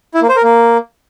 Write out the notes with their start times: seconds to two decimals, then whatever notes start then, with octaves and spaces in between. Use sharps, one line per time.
0.15 E4
0.22 A#3
0.29 C5
0.36 A#4
0.43 A#3